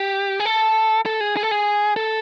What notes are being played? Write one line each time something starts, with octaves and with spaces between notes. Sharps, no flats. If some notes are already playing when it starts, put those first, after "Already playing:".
Already playing: G4
G#4
A4
A4
G#4
G#4
A4
G#4
A4